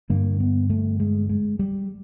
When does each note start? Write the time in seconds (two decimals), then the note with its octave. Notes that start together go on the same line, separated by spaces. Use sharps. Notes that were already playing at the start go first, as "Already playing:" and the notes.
0.10 G2 D3 A#3
0.40 B3
0.70 A3
1.00 G#3
1.29 G#3
1.59 G3